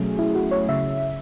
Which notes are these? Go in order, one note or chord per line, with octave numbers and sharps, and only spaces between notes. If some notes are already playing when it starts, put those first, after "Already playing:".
Already playing: B2 F#3 A3 C#4 G#4
E4
F#4
C#5
C#3 E5